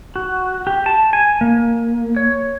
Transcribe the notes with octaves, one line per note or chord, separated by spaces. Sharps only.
F#4
G4
A5
G#5
A#3
C#5